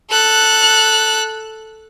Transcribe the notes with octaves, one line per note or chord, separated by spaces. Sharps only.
A4 F#6